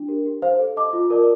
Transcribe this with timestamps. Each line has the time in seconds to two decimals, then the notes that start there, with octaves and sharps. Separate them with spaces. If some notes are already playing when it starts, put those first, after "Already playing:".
Already playing: D4
0.08 G4 A#4
0.26 G4
0.42 C5 F5
0.59 A4
0.77 D#5 A5 D6
0.93 F4
1.10 A#4 D5 A5 D6